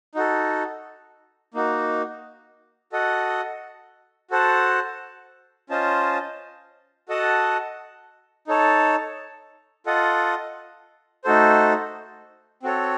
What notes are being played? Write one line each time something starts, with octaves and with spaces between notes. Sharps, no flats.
D#4 F#4 A4
A#3 D#4 F#4
F#4 A4 D#5 F#5
F#4 A4 C5 F#5 A5
C#4 F4 C5 D#5 A5
F#4 A4 D#5 F#5 A5
D#4 A4 C#5 A5
F4 A4 D#5 F#5
A3 D#4 F#4 A4 C5
C4 F#4 A4 C#5